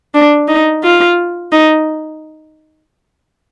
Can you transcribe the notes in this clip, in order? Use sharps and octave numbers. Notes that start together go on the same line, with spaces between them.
D4
D#4
F4
D#4